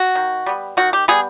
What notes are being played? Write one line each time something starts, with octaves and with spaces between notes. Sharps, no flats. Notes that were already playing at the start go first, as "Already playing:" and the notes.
Already playing: F#4
D#3
G3 B3
D#3 F#4
G4
G3 B3 G#4